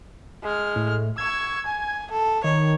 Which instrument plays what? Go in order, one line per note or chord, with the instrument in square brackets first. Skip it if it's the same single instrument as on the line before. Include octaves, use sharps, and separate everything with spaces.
[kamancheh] G#3 F6
[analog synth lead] A2
[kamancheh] C#6 E6 [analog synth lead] G#6
[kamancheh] G#5
A4
[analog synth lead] D#3 [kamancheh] C#5